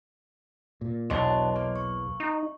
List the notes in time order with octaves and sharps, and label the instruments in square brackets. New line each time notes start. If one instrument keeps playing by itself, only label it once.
[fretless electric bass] A#2
[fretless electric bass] B1 [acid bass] E2 [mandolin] D4 F#4 A5 [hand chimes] C#5 D#5 C6
[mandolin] A#3
[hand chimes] C#6
[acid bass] D#4